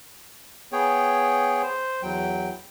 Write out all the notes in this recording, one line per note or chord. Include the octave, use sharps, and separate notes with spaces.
B3 G#4 C#5 G5
C5
E2 F#3 G5